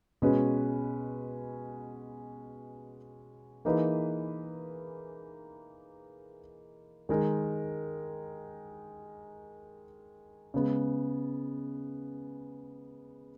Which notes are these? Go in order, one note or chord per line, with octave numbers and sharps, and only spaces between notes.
B2 G#3 C#4 F#4 B4
E3 A#3 D#4 G#4 B4
D#3 G#3 D#4 A#4
C#3 G#3 B3